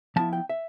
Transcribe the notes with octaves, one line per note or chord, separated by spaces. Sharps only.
F3 B3 E4 A5
G5
E5